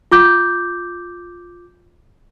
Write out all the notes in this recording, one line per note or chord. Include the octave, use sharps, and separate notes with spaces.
F4 D6 G6